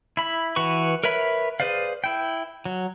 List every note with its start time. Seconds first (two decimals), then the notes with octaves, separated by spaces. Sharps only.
0.17 E4 B5
0.56 E3 F#4 B4 C#6
1.03 A#4 B4 C#5 E5 B5
1.60 G#4 B4 C5 D5 F5
2.04 E4 G5
2.66 F#3